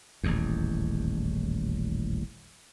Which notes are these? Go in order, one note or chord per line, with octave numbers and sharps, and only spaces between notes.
D#1 A1 E2